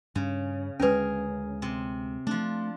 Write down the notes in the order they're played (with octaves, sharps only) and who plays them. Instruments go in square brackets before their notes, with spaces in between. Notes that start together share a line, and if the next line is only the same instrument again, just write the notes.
[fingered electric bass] G2 [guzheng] C#3
[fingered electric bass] D2 G#3 [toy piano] C#4 B4 [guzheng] G#4 A#4
[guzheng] C3
[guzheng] F3 D4 [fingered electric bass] A3